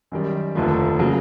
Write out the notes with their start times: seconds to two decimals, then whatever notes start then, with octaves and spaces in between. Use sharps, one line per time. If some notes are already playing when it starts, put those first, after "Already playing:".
0.12 F#2 D#3 G3
0.55 F1 D#2 D3 F3 A3
0.99 C#3 F#3 A#3